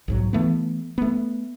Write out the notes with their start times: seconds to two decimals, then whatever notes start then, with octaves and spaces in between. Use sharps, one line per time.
0.08 B1 G#2 F#3
0.33 E3 A3 B3
0.98 A3 B3